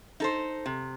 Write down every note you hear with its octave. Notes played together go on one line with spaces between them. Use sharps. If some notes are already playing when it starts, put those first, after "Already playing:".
D#4 A4 C5
C3